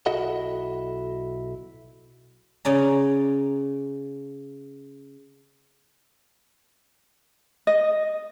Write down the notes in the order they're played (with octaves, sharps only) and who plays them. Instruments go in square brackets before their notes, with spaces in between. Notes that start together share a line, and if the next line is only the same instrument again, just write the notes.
[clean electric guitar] B1 E4 F#4 A4 D#5 F#5
[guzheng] C#3 C#4 D5 G#5 A#5
[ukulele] D#5